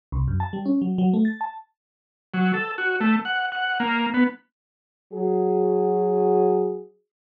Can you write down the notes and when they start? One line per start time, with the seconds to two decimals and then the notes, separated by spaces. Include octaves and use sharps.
0.12 C2
0.28 F#2
0.40 A5
0.53 G3
0.65 C#4
0.81 F#3
0.98 F#3
1.13 A3
1.25 A6
1.41 A5
2.34 F#3
2.54 A4
2.78 F#4
3.01 A3
3.25 F#5
3.52 F#5
3.80 A#3
4.14 B3
5.13 F#3 F#4 G#4